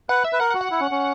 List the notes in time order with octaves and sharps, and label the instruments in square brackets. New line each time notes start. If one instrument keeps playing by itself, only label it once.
[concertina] B4 [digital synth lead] F#5
[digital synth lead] E5
[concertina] B4
[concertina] A#4 [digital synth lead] F#5
[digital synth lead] F#5
[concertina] F#4
[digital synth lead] F#5
[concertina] E4
C#4
C#4